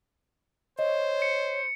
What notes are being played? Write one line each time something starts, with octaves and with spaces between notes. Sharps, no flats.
C5 C#5 D#5
C#7